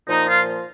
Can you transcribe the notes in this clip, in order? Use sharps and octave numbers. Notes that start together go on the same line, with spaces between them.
A#2 F3 D#4
F4